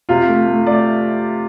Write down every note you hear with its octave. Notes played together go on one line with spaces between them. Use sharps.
C3 F4
A3
A3
A3 D5